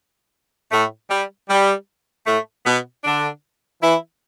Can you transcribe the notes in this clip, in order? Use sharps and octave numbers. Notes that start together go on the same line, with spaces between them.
A2 A3
G3
G3
A2 A3
B2 B3
D3 D4
E3 E4